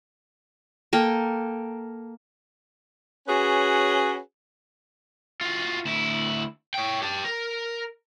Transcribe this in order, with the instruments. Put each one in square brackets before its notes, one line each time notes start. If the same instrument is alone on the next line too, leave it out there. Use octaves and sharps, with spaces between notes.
[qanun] A#3 A4 G5
[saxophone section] C#4 F#4 G#4 B4 C#5
[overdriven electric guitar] F4 F#4
D2 E4
C#5 G5
G4 A5
A#4